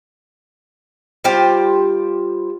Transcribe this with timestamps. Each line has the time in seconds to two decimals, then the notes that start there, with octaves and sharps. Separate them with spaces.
1.24 G3 F4 G4 C5